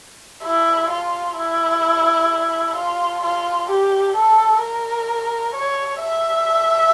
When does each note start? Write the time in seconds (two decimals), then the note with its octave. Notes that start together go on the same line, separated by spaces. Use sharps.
0.44 E4
0.90 F4
1.37 E4
2.76 F4
3.24 F4
3.70 G4
4.16 A4
4.62 A#4
5.55 C#5
6.01 E5